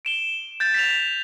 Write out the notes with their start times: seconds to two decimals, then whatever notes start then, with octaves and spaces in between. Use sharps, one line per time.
0.05 D7 E7 G7
0.60 G6 A6
0.74 B6 F7